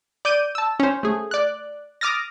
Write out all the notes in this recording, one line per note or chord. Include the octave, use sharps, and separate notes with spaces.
D5 D6 G6 D#7
A5 E6
C#4 C5
A3 G#4
D5 F#6
D6 D#6 F6 A6 A#6